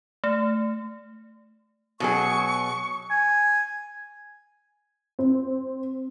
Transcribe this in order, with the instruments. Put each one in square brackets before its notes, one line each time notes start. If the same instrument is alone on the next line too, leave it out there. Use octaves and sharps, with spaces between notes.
[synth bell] A3
[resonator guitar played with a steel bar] B2 F#3 G#4 [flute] C#6
[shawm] G#5
[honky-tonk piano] C4